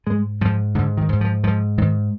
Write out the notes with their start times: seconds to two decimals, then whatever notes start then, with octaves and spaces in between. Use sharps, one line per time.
0.06 G#2 G#3
0.41 G#2 F3
0.75 G#2 D3
0.97 D#3
1.09 G#2
1.21 F3
1.44 G#2 F3
1.78 G#2 D#3